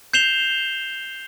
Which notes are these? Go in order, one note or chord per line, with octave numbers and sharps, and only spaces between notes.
G6 C7 E7 F7 G7